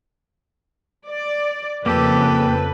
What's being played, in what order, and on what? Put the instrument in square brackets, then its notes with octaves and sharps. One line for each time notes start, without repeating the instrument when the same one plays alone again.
[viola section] D5
[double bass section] F2 C#3 [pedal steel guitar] A#3 C4 G4 [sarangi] A4 [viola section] B4